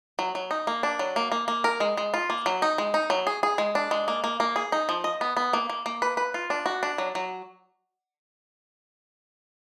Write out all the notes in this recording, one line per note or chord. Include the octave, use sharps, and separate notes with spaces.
F#3
F#3
D#4
A#3
D4
F#3
A#3
A#3
A#3
A#4
G#3
G#3
F4
A#3
F#3
D#4
G#3
D#4
F#3
G#4
G#4
G#3
D4
G#3
A#3
A#3
A#3
G#4
D#4
F3
D#5
B3
B3
A#3
A#3
A#3
B4
B4
F4
D4
F#4
D4
F#3
F#3